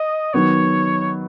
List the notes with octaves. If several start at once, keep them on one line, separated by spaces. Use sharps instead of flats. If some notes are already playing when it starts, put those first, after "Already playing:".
Already playing: D#5
D#3 F#3 B3 C#5